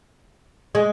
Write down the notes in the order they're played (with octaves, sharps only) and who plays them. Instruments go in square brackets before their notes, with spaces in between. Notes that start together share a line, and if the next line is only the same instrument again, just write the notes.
[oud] G#3